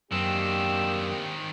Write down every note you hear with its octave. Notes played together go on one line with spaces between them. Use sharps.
F#2 D#3 A#3 C4 D4 G4 E6